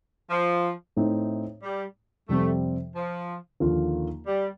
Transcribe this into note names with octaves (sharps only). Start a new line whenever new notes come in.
F3
A2 A3 C4 D#4
G3
F2 C3 G3 A3 C4
F3
D#2 D3 F3 A#3 F4
G3